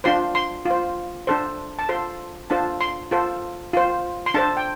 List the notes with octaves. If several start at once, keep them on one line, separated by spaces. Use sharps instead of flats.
D4 F4 C5 C6
C6
F4 C5
D4 A4 C5
A5
F4 A4 C5 C6
D4 F4 A4 C5 A5
C6
F4 A4 C5
F4 C5
C6
D4 A4 C5 A5
G5